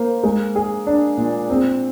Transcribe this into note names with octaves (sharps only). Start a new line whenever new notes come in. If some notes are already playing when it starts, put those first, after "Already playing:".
Already playing: A#3 C5
G#3
G#4
D4
A#2
C4